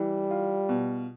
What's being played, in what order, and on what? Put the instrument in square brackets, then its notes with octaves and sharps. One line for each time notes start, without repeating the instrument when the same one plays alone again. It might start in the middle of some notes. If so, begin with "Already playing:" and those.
Already playing: [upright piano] E3 [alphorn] G3
[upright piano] F4
B2